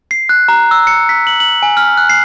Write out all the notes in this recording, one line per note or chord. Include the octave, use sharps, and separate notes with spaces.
C7
F#6
A#5
E6
C#7
B6
F#7
F#7
G#5
F6
F#6
C7